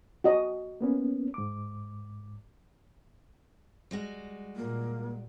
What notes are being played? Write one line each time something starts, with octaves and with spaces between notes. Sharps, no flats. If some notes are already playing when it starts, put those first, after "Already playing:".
F#4 D#5
A#3 B3 C#4
G#2 D6
G3 G#3 F#4
A#2 A#3